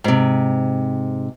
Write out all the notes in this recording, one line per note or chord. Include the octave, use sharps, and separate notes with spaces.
G#2 C3